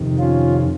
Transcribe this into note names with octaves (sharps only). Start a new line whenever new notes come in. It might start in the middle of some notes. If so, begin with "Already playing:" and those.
Already playing: F2 C3 D#3
C#4 F4